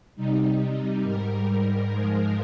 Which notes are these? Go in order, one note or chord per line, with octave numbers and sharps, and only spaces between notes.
C3 G3 D#4
G#2 G3 A#4
A#4
G#2 F3 G#3